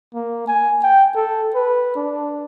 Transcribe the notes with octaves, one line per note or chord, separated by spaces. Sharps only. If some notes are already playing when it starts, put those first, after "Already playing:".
A#3
G#5
G5
A4
B4
D4